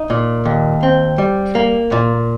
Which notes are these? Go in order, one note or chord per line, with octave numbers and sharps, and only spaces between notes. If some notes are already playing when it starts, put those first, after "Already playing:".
Already playing: D#4
A#2
D#2
C4
G3
A#3
A#2